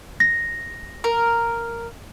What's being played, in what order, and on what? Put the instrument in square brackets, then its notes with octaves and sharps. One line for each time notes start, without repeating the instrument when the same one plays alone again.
[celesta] A#6
[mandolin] A#4